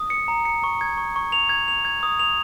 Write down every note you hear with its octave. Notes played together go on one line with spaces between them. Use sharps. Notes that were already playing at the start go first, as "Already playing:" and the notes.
Already playing: D#6
C#7
A#5
C#7
C#6
G#6
C#6
C#6
F7
G#6
F7
G#6
D#6
F7